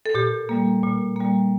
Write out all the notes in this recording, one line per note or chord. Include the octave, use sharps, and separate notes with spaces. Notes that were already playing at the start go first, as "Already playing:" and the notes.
A4
A#2 G4
G3 A#3
A#2
G3 A#3